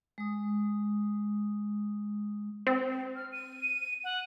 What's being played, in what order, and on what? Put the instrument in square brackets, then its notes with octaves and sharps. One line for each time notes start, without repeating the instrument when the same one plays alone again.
[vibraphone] G#3 D#6
[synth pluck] C4
[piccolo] F6
D#7
F#5